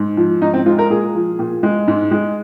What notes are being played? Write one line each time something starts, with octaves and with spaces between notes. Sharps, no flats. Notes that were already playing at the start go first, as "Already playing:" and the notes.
Already playing: G#2
F3
G#2 D#4
C4
G#3 F4
A#4
A#2 G#4
F3
A#2
G#3
G#2
G#3